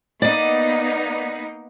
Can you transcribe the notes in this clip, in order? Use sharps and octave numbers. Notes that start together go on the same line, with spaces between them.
A#3 B3 D#4 D5 D#5